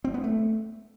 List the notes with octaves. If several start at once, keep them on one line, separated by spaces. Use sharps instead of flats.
C4
B3
A3